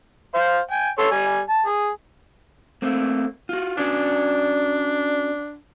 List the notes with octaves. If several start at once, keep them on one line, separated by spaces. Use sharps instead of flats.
C5 F5
G5 G#5
A4 C#5 C6
G3 G#5
A5
G#4
A3 A#3 C4
F4 F#4
C#4 D4 F#4 D5